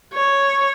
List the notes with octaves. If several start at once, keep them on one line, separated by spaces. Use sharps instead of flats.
C#5